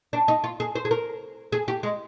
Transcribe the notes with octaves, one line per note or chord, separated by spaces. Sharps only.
D4
D#4
F4
G#4
C5
G#4
A#4
G#4
G4
G#3